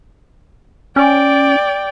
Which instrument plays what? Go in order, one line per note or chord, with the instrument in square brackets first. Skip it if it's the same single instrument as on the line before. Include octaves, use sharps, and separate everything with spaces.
[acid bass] C#4 [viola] D5 G5